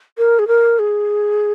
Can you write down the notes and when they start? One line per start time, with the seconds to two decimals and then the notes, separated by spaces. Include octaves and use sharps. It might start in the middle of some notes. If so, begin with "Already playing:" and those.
0.18 A#4
0.39 G#4
0.48 A#4
0.79 G#4